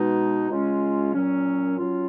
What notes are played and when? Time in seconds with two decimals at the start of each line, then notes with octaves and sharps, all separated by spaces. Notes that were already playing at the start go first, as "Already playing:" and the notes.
Already playing: B2 G#3 D#4
0.50 C#3 G#3 C#4 F4
1.14 A#2 F#3 C#4
1.77 F#3 C#4 F4